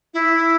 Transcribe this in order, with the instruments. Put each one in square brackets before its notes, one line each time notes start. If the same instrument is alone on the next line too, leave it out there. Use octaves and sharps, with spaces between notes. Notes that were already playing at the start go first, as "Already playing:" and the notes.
[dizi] E4